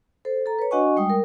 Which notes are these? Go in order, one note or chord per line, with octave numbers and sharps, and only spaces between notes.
A4 C5
A4 A#5
B4 C#5
D4 F#4 D#5 F#5 G#5 C#6
G3 G#3 G5 D#6
A#4